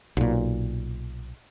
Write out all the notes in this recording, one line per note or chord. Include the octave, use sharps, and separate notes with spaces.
B1 A#2